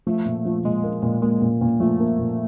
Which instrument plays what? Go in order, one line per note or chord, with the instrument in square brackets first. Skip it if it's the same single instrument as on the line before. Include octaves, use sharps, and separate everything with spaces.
[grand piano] F3 [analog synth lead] A3
[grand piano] A#2
F3
[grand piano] A#2 [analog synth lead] G#3
[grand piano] A#3
A#2
[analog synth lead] G#3 [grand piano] A#3
[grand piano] A#2
A#2
[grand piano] F3 [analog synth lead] A3
[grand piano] A#3
A#2